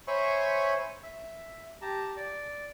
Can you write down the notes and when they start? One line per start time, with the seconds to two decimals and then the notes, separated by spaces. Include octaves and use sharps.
0.07 C5 C#5 E5 G#5 B5 C#6
1.03 E5
1.82 G4 A5 A#5
2.17 D5